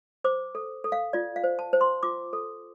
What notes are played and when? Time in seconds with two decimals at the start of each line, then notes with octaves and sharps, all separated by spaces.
0.24 C5 D6
0.55 A4
0.84 A4
0.92 F5
1.13 F4 D5
1.36 F5
1.44 C5
1.59 A5
1.73 C5
1.81 C6
2.03 F4 D6
2.33 A4